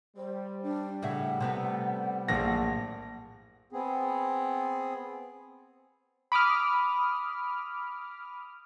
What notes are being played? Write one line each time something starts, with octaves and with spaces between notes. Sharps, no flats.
G3 C5
D4
A2 C#3 E5 F#5
C3 A3 B3
A#1 F#2 A2 A#3 A#6
B3 C4 G#4
B5 D6 D#6 F6